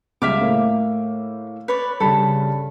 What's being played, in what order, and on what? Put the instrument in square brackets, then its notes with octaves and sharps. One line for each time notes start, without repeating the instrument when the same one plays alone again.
[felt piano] C#2 G3 [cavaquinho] E5 F5 D6
[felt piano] A2 A#3
[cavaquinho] B4 C#5 D5
[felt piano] G2 C#3 [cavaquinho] A4 B5